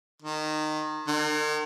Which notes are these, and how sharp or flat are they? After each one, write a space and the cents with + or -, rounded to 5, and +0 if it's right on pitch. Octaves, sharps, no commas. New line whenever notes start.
D#3 -20
D#3 -40